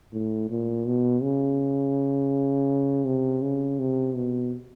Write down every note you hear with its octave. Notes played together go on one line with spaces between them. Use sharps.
A2
A#2
B2
C#3
C3
C#3
C3
B2